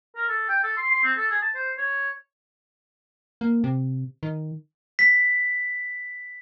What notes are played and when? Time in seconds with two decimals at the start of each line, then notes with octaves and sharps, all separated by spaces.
0.16 A#4
0.29 A4
0.49 G5
0.63 A4
0.77 C6
0.91 C6
1.03 C4
1.17 A4
1.30 G#4
1.42 A5
1.55 C5
1.78 C#5
3.41 A#3
3.64 C3
4.23 D#3
4.99 B6